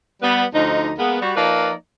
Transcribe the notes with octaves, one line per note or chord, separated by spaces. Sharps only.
G3 B3
D2 F3 D#4
G#3 A#3 B3
G3 F#4
F3 A#3 D#4 B4 D5